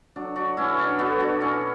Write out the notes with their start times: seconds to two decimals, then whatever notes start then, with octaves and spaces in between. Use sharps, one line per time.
0.16 F#3 D4
0.36 D4 F#4
0.57 B2 C#4 E4
0.79 D4
0.99 B3 F#4 A4
1.20 D4 F#4
1.41 B2 C#4 E4